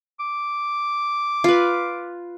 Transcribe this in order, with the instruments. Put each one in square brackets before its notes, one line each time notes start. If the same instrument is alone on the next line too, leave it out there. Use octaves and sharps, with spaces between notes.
[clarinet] D6
[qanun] F4 B4